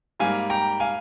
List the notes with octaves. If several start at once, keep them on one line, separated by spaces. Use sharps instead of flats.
G#2 G3 A#3 F5 G#5
G5 A#5
F5 G#5